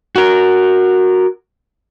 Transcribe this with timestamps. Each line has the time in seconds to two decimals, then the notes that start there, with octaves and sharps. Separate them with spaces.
0.16 F#4 A#4